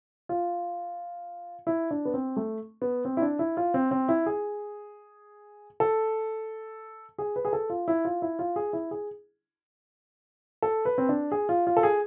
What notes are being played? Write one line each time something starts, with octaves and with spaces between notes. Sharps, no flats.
F4
E4
D4
B3
C4
A3
B3
C4
E4
D4
E4
F4
C4
C4
E4
G#4
A4
G#4
B4
G#4
A4
F4
E4
F4
E4
F4
G#4
E4
G#4
A4
B4
C4
D4
G#4
F4
F4
A4
G#4